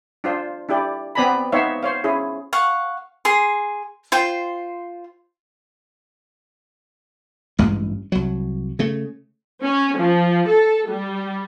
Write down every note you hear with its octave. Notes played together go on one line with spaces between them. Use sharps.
D4 F4 C5
D4 E4 G4 D5
B3 C4 D5 G#5 A#5 B5
B3 D#4 C5 C#5 E5 F5
C5 C#5 F5
C#4 E4 G#4
F5 F#5 C#6
G#4 C6
F4 C5 G5
A1 G2 G#3
C2 F#3
C#3 A3
C#4
F3
A4
G3